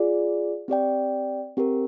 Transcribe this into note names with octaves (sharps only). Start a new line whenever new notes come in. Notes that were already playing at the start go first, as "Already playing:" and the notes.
Already playing: F4 G#4 D5
C4 G4 D5 G5
C4 G4 A#4